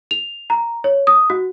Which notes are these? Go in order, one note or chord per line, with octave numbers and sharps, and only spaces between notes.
F7
A#5
C#5
D#6
F#4